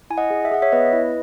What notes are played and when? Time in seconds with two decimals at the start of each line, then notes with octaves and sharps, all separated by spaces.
0.10 E4 G#5
0.18 D#5 F#5
0.30 G#4
0.45 E5
0.51 G#4 F#5
0.62 C#5 E5
0.72 B3 B4 D#5
0.93 E4